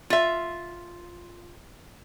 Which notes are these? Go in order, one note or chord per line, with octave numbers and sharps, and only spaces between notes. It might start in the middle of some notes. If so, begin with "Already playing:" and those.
F4 E5